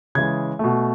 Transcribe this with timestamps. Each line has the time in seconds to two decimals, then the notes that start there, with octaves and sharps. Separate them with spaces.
0.15 C#3 E3 G#3 G#6
0.59 B2 A3